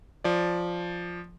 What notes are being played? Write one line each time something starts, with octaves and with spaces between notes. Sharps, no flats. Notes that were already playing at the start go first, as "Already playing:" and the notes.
F3 D5